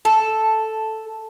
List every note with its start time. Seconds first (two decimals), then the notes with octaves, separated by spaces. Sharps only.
0.05 A4